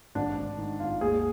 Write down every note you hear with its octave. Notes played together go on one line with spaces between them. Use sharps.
G#1 D4
G#1
D#3
G#1 F4
D#2 G#4